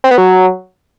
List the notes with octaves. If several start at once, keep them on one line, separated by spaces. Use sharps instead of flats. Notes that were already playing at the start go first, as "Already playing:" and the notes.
C4
B3
F#3